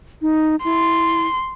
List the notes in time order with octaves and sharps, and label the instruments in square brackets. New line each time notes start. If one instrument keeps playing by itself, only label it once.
[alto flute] D#4
[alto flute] E4 [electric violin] C6